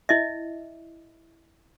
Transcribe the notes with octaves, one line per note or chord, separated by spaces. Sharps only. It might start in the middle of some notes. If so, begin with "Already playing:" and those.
E4 D#5 E5